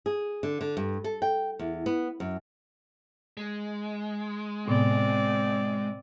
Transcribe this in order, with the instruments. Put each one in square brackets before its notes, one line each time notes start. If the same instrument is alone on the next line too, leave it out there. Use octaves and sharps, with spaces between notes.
[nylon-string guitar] G#4
D3
D3
G2
A4
G5
E2
B3
F#2
[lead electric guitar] G#3
[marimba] A2 C3 B3 [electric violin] C4 D5